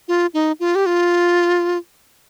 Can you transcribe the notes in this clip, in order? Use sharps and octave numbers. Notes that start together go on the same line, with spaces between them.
F4
D#4
F4
G4
F4